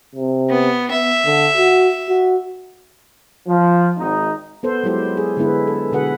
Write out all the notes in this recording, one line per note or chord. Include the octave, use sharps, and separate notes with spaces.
C3
B3
B3 E5
D3
F#4
F#4
F3
G#1 D#4
B3 A4 C5
F#3 G#3 E4 G4 C5
G#4
D3 G#3 B3 E4 B4
A4
B2 D3 G#4 B4 F#5